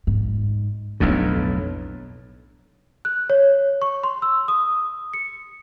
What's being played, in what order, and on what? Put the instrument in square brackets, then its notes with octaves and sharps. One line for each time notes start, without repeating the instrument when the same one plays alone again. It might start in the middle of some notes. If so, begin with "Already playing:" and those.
[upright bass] G#2
[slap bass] B1 F2 A2 [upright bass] D4 D#4
[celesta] F#6
C#5
C#6
C6
E6
D#6
C#7